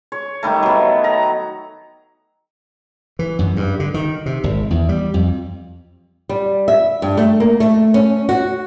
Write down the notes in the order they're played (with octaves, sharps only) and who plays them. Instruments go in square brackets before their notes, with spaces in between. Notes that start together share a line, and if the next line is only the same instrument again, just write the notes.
[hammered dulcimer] C#5
D#3 G3 A3
F#3 B3
A#5
[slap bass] E3
F#2
G2
D3
D#3
C3
G#1
E2
G3
F2
[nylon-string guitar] G3
E5
G2
A3
A#3
A3
C#4
F#4